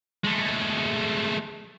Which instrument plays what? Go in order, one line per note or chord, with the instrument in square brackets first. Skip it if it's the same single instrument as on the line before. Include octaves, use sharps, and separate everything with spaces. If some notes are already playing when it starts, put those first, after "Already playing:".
[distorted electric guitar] G#3 A3